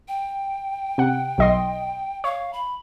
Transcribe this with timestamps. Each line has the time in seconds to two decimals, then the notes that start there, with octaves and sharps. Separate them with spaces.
0.08 G5
0.98 C3 F#5
1.38 B1 D#5 C6
2.24 C#5 F5
2.53 B5